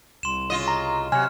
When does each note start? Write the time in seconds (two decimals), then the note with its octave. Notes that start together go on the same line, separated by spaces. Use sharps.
0.23 C2 C6 E7
0.50 C#3 F4 D#5
0.68 A#5
1.12 C3 F#3 G#5 F6 C#7